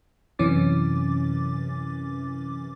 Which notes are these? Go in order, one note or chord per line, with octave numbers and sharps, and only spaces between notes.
F#2 C3 E3 C#4 D6 A6